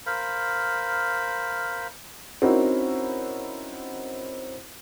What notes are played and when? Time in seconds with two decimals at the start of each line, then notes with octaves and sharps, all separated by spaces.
0.06 A#4 C5 F5 B5
2.42 C4 C#4 D#4 E4 F#4 A#4